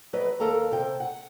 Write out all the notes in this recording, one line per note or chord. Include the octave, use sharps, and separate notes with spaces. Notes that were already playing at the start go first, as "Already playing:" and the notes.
F#3 B4 D#5
D#2 A4 A#4 F5 A#5
C3 G5
F#5